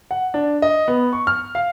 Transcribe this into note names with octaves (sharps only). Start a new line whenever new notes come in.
F#5
D4
D#5
B3
C#6
F6
F5